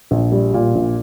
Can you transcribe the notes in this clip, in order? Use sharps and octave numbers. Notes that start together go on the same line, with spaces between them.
A#1
G3
A#2
A#1